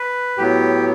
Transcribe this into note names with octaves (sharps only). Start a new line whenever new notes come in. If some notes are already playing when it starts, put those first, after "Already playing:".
Already playing: B4
A2 F#3 B3 G4